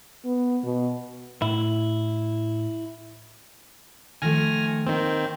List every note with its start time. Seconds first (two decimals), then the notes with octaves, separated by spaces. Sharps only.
0.25 B3
0.64 B2
1.42 A2 E4
4.22 D#3 F3 A3 G#5 F6 A#6
4.86 D#3 A#3 C4